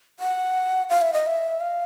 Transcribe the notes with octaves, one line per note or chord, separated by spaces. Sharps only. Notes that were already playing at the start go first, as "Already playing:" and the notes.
F#5
F5
E5
D#5
E5
F5